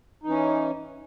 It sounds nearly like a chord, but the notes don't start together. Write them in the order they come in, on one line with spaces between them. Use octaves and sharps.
D#4 E3 C#4